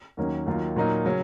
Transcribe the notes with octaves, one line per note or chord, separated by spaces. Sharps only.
D#2 D#3 F#3 A#3 C#4
D#2 D#3 F#3 A#3 F4
A#2 F#3 A#3 D#4
C#3 F#3 C#4